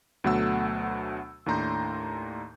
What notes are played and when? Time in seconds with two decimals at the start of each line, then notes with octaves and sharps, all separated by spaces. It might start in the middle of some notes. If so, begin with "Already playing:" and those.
0.24 D2 B2 F#3 A3 F#5 E6
1.46 D#2 A2 D4 A#5 C6 G6